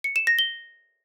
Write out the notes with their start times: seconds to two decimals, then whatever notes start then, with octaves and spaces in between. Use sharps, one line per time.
0.04 C#7
0.16 E7
0.27 A#6
0.39 G7